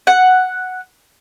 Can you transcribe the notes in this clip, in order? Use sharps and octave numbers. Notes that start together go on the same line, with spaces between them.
F#5